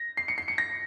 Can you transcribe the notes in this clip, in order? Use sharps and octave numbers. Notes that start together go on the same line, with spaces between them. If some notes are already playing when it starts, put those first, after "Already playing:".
Already playing: A#6
C7
C#7
C7
C#7
A#6